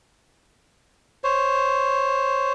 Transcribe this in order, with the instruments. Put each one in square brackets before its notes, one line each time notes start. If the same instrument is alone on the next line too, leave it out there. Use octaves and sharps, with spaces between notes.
[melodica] C5 C#5